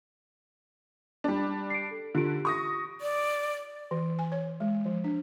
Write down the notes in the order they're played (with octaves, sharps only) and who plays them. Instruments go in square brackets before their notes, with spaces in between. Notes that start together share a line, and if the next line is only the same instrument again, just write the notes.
[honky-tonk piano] G3 D4
[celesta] C7 D7
A4
[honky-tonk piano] D3 [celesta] F4 G4 D7
[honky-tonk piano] C#6 D#6 A#6
[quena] D5
[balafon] E3
G#5
C#5
G#3
F3
D4